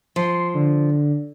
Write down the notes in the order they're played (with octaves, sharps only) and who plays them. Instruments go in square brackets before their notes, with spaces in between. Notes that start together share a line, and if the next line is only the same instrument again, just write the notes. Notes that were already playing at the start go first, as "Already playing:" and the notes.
[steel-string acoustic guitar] F3 [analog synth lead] C6
[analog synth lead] D3